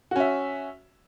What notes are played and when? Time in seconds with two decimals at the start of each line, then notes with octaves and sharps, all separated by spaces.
0.11 F#4
0.16 C#4
0.20 E5